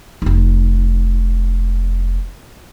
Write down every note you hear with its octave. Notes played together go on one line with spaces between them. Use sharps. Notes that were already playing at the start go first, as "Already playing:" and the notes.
F1 D#4